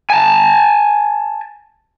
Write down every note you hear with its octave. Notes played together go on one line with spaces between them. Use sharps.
G#5 A5